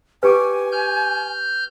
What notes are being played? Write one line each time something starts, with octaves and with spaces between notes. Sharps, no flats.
G4 B4 G#5 C#6 D6
F6 G6